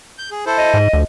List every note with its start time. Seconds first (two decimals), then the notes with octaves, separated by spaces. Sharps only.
0.18 G6
0.31 G#4
0.46 E4 A4 C5
0.58 D#5
0.74 G#2
0.93 D2 F3